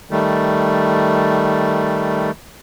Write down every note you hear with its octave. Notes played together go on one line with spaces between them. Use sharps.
D#3 G3 A3